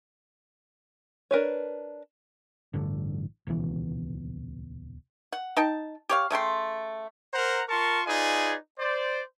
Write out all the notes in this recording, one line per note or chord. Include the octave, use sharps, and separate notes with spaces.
D4 A#4 B4 C#5
A1 G2 D3
D#1 C#2 B2 E3
F#5
D#4 G5 A5
G4 C#5 F5
C#3 A3 G5 C6
A#4 C5 F#5 A#5
F4 A#4 A5 C6 C#6
D#4 F4 G#4 B4 D5 G#5
C5 D5